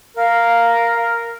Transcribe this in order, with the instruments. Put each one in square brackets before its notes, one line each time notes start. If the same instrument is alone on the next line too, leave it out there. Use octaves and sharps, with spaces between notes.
[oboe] A#4 [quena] F5